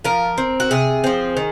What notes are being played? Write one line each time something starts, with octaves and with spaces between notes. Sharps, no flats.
F3 A#4
C4
F#4
C3 G#4
F3 C4
D#3